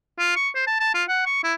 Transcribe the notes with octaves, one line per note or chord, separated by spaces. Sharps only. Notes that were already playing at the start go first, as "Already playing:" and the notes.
F4
C#6
C5
A5
A5
F4
F#5
C#6
E4